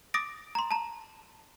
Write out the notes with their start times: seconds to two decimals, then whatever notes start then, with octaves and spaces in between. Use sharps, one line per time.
0.14 D6 D#6 A6 A#6 D7
0.55 A#5 C6
0.71 A5 A#5